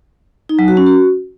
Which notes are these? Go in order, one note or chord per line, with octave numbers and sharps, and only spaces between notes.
D#4
F#3
F#4
C#4
F#4